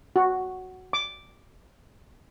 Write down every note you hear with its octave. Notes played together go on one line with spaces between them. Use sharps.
F#4
D6